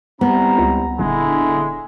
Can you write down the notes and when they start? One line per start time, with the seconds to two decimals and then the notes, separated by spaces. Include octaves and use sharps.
0.21 G3 B3 C4 E4 A#5
0.58 C#2
0.99 D#1 D3 G#3 E4